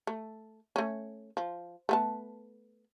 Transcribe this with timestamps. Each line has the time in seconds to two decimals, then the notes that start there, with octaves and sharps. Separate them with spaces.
0.07 A3
0.76 A3 C#4
1.37 F3
1.89 A3 B3 A5